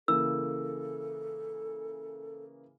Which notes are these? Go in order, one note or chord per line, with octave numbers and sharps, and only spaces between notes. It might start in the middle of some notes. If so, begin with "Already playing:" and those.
C#3 E3 A#3 A4 E6